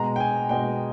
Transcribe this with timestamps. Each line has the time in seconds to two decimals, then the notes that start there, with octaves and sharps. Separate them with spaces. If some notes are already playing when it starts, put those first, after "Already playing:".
Already playing: B2 G#3 A#5
0.16 G5
0.20 G#5
0.49 B2 G#3 G5